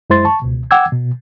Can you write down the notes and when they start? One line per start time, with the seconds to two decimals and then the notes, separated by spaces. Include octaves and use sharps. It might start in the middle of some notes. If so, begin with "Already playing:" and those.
0.10 F#2 G#3 E4 C5 C6 A6
0.25 A5 C#6
0.42 C#2 B2
0.71 F#5 G5 D6 E6 G#6
0.92 B2